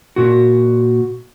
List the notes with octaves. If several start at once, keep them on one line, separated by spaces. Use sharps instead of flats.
A#2 F#4